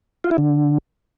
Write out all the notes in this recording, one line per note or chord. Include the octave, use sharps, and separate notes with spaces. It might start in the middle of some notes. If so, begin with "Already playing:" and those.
F4
E4
D3